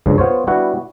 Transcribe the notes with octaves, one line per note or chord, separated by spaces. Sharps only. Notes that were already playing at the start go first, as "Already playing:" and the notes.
C#2 G2 C#3 F3
B3 F4 C5 C#5
G3 B3 D4 E4 F#4 F#5